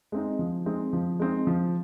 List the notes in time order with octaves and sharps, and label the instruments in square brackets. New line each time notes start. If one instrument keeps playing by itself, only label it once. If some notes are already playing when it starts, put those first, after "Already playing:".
[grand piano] G#3 C4 D#4
F3
G#3 C4 D#4
F3
G#3 C4 D#4
F3